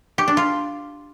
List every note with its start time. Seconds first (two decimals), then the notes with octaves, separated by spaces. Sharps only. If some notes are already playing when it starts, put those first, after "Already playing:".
0.18 G4
0.28 D4
0.37 F4